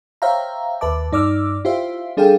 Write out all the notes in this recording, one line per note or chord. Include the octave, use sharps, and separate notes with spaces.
C5 C#5 E5 F5 G5 A#5
D#2 B4 E5 A5 D6
G2 D#4 D5 D6 E6 F6
E4 F4 G4 C5 E5 F5
G3 D4 G#4 A4 F5 G5